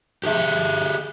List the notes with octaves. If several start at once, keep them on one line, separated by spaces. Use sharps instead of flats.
G4 G#4 E5